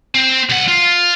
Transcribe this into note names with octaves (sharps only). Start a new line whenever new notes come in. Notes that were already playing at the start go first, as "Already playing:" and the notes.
C4
C2 F#5
F4